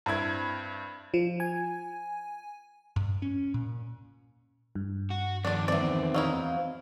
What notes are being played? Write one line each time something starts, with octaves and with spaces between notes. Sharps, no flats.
G2 C4 E4 G#6
F3
G#5
G2
C#4
A#2
G2
F#4
F2 D#3 D4 D5
E2 C4 D5
F#3 D#4 E4 F5